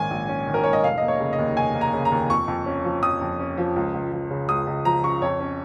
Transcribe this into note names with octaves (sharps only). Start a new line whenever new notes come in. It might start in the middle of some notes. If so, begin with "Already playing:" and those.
Already playing: A#1 G#2 D#3 C#4 G#5
A#1
C#4
D#3
A#4
G#2 C#5
D#5
F1 F5
A#3 D#5
C#5
C#3
D#5
D#2
F1 G#5
A#3
A#5
C#3
A#5
D#2
F2 C#6
F2
C#4
F3
F2 D#6
F2
C#4
F3
C#2
C#2
F3
C#3
C#2 D#6
C#2
F3 A#5
C#3 C#6
F2 C#5
C#4